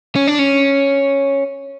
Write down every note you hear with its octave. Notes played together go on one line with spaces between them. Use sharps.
C#4
D4
C#4